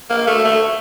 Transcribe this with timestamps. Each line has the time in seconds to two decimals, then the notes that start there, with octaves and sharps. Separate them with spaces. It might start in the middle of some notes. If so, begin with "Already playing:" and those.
0.10 A#3
0.27 A3
0.45 A3